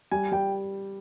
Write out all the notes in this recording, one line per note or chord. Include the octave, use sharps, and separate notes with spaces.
G3 G#5
G3 G5